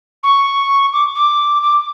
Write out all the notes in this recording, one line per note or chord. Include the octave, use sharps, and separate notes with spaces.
C#6
D6
D6
D6